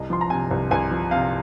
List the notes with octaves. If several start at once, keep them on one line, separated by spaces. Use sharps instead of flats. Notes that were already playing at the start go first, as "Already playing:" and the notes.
Already playing: C2 D#5
F3 C6
A#5
C3 G#5
C2
C2 G#5
F3
C3 F5